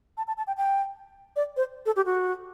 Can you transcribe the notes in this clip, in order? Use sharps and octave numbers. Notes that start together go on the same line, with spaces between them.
A5
A5
A5
G5
G5
D5
C5
A4
G4
F#4